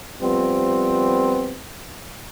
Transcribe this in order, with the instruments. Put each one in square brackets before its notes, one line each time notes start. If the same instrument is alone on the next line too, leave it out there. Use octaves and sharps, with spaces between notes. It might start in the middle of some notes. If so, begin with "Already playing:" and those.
[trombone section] F3 G3 B3 C4